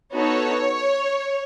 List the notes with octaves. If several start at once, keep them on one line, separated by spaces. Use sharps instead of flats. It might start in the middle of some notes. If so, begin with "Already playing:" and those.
B3 D#4 F#4 A4 C#5